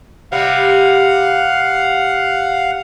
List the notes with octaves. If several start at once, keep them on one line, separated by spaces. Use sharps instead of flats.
C3 G3 F5 F#5